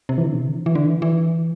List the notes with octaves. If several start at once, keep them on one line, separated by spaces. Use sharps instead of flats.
C3
E3
D3
B2
C3
D3
E3
E3
D3
E3
E3